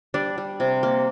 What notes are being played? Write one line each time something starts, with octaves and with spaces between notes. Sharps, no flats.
G3 D4
G3
C3
A#3